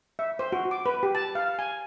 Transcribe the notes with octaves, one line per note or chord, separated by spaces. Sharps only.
E5
C5
F#4
D6
B4
G4
A5
F5
G#5